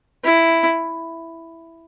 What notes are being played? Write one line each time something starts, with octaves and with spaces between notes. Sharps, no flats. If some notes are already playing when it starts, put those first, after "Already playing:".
E4